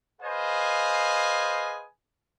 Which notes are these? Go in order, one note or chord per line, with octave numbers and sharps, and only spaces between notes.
G#4 B4 C5 D#5 F5 G#5